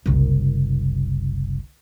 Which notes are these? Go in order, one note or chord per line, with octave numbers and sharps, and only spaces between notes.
F#1 C2